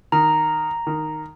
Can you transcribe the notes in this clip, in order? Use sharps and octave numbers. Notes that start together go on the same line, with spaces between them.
D#3 A#5
D#3